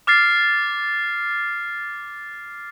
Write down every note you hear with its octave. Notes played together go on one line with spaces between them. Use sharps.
D6 F6 A6 C7